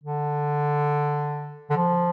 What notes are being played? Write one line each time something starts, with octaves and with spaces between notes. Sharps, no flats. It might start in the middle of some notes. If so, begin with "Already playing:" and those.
D3
D3
F3